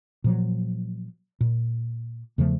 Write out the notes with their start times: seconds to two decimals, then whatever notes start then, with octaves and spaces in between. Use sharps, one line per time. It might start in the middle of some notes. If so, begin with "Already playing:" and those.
0.24 A#2 F3 F#3
1.41 A#2
2.38 E2 C#3 F3 A3